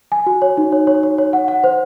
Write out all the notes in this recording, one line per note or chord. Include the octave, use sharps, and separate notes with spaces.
G#5
F#4
C#5
D#4
C#5
C#5
C#5
C#5
F#5
F#5
C5